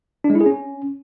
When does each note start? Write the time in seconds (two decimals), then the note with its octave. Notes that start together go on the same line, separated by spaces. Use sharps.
0.24 D4
0.30 G#3
0.35 E4
0.41 G#4
0.46 C#4